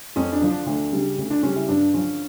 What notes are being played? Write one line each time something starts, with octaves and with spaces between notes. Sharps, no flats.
F2 C#4
D4
D3 F3
D4
D2 D4
C#3 G3
D2
D4
C#3 G3 C#4
E4
G2 D4
D3 F3 C#4